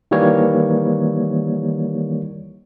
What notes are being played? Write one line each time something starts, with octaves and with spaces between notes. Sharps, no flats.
D#3 E3 G3 A#3 C#5